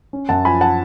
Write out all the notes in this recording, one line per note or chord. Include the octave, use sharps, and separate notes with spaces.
C#4
F#2 F#5 A5
F3 G#5 B5
F#5 A5